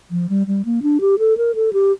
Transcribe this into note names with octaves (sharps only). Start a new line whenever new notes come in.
F3
G3
G3
A#3
D4
G4
A4
A#4
A4
G4